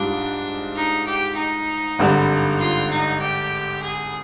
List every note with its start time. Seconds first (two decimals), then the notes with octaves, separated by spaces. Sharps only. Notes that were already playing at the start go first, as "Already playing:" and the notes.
Already playing: G#2 G3 D4 F4
0.76 D#4
1.07 G4
1.37 D#4
1.99 G#1 G2 D3 G3
2.60 F4
2.91 D#4
3.21 G4
3.82 G#4